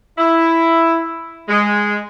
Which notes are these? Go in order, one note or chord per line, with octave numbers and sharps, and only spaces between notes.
E4
G#3